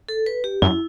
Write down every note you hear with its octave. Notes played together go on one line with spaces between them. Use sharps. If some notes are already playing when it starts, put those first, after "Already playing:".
A4
B4
G4
F#2 E4